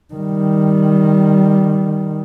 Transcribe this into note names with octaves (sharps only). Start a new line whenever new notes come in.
D#3 G3